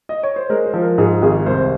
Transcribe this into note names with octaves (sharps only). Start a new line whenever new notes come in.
D#5
C#5
C5
G#3 A#4
C5
F3
A#4
G#2 G#4
G#1 G#4
C2 C5